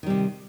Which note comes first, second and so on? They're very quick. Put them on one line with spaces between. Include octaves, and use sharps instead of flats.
D#3 G3 C3